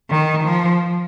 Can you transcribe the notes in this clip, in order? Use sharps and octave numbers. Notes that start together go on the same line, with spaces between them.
D#3
F3